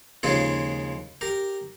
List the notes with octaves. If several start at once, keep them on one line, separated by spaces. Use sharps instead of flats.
D#2 C#3 F3 G#3 F4 G#4
G4 A#4